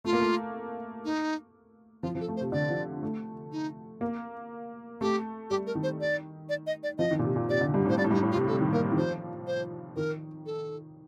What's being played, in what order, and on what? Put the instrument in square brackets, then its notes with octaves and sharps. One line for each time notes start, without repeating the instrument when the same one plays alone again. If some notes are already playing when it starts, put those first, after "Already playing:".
[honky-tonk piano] A3 [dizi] F4
[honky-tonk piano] A#3
A3
[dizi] D#4
[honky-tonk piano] F3 [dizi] F4
[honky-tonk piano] F3
[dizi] A4
[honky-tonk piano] A3
[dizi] C5
[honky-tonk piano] C3
[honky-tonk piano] D3 [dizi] D5
[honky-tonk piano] F3
A3
[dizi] D#4
[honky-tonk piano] A#3
[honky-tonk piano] A3 [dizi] G4
[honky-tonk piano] G3 [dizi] G4
[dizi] A#4
[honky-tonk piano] D#3
[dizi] C5
D5
D5
D#5
D5
[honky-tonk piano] F3 [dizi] D#5
[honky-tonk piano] D#3
A#2
C3
A#2
[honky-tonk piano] C3 [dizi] D5
[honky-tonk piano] D3
G2
A2
[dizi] C5
[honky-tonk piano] G2 [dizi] D5
[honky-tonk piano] A2
G2
[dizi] D#4
[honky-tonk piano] A2
[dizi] F4
[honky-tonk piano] C3
[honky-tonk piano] C3 [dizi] A4
[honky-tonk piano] D#3
[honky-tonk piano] A#3 [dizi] A#4
[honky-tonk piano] D#3
[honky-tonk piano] F3 [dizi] C5
[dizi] C5
[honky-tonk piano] D#3 [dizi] A#4
[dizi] A4